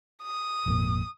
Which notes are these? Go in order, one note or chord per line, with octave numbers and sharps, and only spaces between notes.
D#6
G#1 F2 A#2